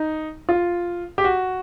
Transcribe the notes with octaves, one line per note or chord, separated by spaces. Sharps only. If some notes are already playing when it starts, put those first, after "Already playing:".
Already playing: D#4
F4
G4
F#4